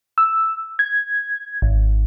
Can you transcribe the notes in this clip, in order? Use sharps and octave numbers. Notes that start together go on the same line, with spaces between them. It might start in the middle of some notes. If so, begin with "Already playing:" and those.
E6
G#6
G#1